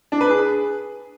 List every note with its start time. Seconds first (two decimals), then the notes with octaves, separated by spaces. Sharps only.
0.12 D4
0.21 B4
0.29 G#4